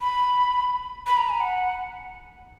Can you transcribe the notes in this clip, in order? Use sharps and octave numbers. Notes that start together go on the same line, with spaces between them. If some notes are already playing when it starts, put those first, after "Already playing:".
B5
B5
A#5
G#5
F#5